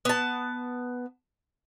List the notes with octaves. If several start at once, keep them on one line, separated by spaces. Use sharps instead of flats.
B3 A5